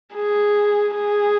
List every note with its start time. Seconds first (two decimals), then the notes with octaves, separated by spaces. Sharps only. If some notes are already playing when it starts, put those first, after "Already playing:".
0.15 G#4
0.95 G#4